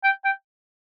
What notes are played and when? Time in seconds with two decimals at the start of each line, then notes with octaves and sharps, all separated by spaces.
0.04 G5
0.25 G5